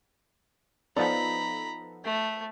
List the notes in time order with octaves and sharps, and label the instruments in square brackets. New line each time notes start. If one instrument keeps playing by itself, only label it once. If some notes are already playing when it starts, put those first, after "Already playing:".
[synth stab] F3 B3 A4 [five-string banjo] D#4 D5 [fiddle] A#5 B5
[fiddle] A3